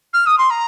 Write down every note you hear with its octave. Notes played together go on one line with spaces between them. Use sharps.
F6
D#6
C6
A#5